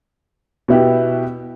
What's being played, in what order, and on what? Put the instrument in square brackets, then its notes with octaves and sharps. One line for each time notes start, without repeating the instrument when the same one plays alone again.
[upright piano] B2 B3 E4 G4